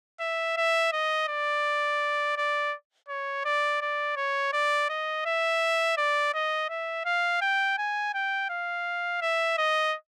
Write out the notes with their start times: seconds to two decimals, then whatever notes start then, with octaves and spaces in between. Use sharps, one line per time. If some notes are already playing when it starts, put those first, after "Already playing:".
0.20 E5
0.57 E5
0.92 D#5
1.28 D5
2.37 D5
3.08 C#5
3.45 D5
3.81 D5
4.16 C#5
4.53 D5
4.89 D#5
5.25 E5
5.97 D5
6.33 D#5
6.69 E5
7.05 F5
7.41 G5
7.78 G#5
8.14 G5
8.50 F5
9.21 E5
9.58 D#5